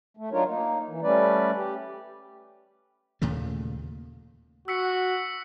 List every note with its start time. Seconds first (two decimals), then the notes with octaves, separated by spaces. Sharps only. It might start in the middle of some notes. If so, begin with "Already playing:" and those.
0.17 A3
0.32 F#3 D4 D#4 F4 A#4 C#5
0.46 A#3 D#4
0.88 E3
1.02 G3 A3 C#4 B4 D5
1.56 G4
3.22 D#2 A#2 C#3 A3
4.68 F#4 E6 B6 C#7